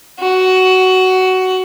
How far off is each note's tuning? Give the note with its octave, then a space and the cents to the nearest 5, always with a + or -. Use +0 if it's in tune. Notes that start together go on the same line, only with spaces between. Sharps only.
F#4 +15